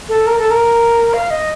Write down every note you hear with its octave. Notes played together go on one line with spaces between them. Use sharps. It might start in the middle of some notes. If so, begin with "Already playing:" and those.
A4
A#4
A4
A#4
F5
D#5